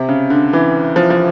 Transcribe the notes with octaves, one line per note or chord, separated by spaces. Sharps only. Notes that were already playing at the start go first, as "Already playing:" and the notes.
Already playing: C3
C#3
D3
E3
F3
F3